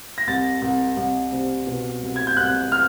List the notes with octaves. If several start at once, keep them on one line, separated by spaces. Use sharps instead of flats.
A#6
C2 A6
C2
C2
C3
B2
C2
G#6
G6
C2 F#6
F6